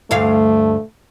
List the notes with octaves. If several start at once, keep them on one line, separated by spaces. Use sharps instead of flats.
D2 G2 A3 F5